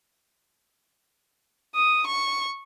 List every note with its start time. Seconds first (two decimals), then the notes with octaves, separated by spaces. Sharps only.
1.75 D#6
2.07 C#6